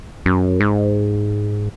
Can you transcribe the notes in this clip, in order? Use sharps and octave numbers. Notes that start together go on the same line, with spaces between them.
F#2
G#2